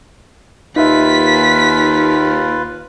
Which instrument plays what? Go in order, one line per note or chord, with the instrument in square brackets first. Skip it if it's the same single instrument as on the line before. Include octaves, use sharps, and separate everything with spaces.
[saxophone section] D#2 [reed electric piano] D#4 E5 [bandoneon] F4 B4 [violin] B6